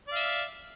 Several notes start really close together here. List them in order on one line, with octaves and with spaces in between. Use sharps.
D5 F5 E5